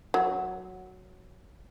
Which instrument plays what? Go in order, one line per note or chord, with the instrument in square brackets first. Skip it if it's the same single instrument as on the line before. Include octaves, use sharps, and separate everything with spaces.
[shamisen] F#3